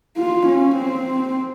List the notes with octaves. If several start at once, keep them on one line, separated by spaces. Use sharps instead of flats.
F4
C#4
C4